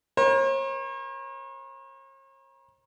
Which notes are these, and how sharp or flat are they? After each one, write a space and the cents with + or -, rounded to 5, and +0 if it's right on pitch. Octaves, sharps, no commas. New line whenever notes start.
A#4 +40 C#5 -45